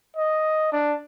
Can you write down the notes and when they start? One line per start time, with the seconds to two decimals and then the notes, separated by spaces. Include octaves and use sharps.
0.17 D#5
0.72 D4